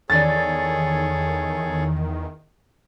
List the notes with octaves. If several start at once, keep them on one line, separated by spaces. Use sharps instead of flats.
E2 D#3 G#4 A4 C#5 D5 A6